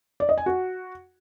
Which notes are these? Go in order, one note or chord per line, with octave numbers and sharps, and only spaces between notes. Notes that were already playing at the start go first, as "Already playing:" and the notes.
D5
D#5
G#5
F#4